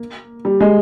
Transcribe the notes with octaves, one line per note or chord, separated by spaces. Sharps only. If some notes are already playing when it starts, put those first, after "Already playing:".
Already playing: A#3
G3
G#3